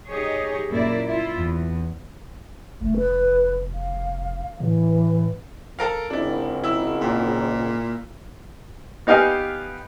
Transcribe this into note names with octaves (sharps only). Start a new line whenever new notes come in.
D#4 G4 G#4 C#5
F#2 A#2 A#3 E4 D5
E4 F4
E2
F1 A3
B4
F5
A2 E3
A4 A#4 F5
G#1 C#2 D4 E4
E4 E6
A#2
B3 D#4 G4 F5 G#5